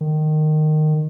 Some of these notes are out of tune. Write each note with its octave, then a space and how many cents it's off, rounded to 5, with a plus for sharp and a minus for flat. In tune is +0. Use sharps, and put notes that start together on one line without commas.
D#3 -15